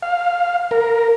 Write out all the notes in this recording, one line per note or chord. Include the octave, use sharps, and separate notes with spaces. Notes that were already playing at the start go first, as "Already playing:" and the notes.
F5
A#4